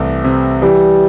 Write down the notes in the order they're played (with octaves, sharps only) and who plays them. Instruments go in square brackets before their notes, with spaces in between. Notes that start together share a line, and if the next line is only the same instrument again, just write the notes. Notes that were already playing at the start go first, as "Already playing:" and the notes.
Already playing: [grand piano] C2 E3 A3
C3
[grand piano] E3 [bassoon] G3